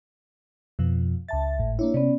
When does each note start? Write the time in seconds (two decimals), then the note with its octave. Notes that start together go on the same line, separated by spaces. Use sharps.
0.79 F2 B2 F3
1.28 C#2 E5 A5 A6
1.59 G#1 A2
1.79 A#3 D4 E4 C#5
1.94 C3 B3 C#4 D5